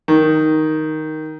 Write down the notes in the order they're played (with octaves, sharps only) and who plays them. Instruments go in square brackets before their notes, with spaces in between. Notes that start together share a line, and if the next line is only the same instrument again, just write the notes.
[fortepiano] D#3